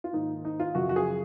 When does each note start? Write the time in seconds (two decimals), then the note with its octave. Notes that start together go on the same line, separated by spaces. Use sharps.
0.04 F4
0.13 G#2 D#3 A#3 D#4
0.45 D#4
0.60 F4
0.75 F#2 C#3 F3 F#4
0.89 F#4
0.96 G#4